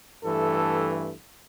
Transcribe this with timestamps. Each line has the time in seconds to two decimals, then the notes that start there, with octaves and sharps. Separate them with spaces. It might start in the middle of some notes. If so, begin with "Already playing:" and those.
0.24 G2 E3 A3 A4